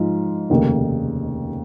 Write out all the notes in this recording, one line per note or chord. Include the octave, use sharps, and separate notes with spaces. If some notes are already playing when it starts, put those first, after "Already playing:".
Already playing: G#2 F3 F4
F1 D#2 C#3